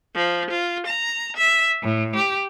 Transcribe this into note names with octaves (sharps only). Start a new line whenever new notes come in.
F3
F4
A#5
E5
A2
G4